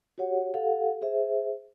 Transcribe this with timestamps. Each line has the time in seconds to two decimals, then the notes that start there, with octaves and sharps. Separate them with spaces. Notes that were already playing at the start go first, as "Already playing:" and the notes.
0.18 F#4 G4 C#5 F#5
0.54 G4 A4 F5 F#5
1.01 G#4 C5 E5